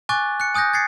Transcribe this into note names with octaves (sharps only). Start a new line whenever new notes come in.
G#5 C#6 D6 F#6 A6
F#6 C#7
G#5 D#6 F#6 G6 A#6
G#6 A6 C7 C#7